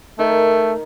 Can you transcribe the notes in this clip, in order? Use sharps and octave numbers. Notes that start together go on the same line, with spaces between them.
D#3 A3